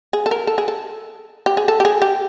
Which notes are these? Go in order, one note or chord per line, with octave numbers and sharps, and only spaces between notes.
G#4
A4
A#4
A4
G#4
A4
G4
G#4
A4
G4
G#4
G4